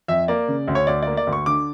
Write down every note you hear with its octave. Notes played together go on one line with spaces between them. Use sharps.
F2 E5
A#3 D5
C#3
D2
C#5
D2 D5
A#3 D5
D5
D2
C#6
D3 D6